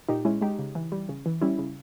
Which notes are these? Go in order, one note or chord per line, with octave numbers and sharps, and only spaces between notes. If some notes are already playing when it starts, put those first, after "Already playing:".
A#2 D#4 G4
G#3 C#4 E4
G#3 D#4 G4
C#3
E3
G3
C#3
E3
G3 C#4 E4
C#3